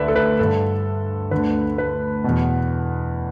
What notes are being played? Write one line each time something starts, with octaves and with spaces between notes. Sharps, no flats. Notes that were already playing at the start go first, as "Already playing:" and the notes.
Already playing: D2 D3 B4 D5 E5
A4
B4
G2 D3 A4
D2 D3 B4
B4
E2 B2